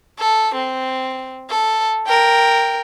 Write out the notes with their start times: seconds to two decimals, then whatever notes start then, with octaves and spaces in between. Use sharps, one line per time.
0.19 A4
0.54 C4
1.50 A4
2.07 A#4 G5